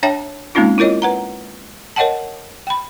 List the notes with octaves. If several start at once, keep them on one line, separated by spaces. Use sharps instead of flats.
D4 C#5 E5 G5 A5
G#3 A#3 C4 C#4 D#4 F4
E4 F4 A#4 C#5 D#5
B4 F#5 A#5
A#4 C#5 D#5 F#5 G5 A5
G5 B5